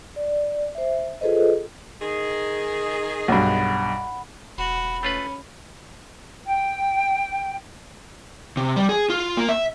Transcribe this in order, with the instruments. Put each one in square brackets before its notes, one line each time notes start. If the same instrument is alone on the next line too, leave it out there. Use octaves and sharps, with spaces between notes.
[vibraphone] D5
C5 E5
F4 G#4 A4 B4 C5 D#5
[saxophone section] D#3 D#4 G#4
[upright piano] B1 G2 [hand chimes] F#5 B5
[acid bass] E1 [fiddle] F#4 [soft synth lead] B5
[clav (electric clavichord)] A3 F4 B4 [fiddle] C#4
[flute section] G5
[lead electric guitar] C3
G3
G#4
F4
A#3
E5